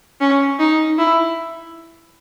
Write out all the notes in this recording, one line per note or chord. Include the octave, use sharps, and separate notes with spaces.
C#4
D#4
E4